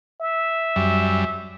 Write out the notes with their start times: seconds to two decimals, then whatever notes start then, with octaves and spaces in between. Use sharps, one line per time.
0.21 E5
0.76 F#2 G3